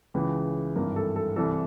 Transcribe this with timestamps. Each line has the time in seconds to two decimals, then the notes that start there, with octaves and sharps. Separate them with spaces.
0.14 C#2 C#3 E3 B4
0.76 G#1 G2 E3 A#4
0.96 A4
1.16 A4
1.36 C2 C3 E3 A4